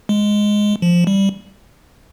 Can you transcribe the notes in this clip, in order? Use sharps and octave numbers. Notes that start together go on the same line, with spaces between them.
G#3
F3
G3